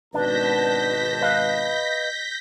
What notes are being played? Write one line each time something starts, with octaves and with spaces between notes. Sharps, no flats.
G#1 B2 D4 B4 A5 G6 A#6 B6
B4 D#5 F5